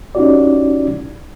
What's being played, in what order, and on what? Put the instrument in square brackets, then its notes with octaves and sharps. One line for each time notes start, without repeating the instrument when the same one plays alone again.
[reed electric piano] C#4 D#4 E4 F#4 G4 D5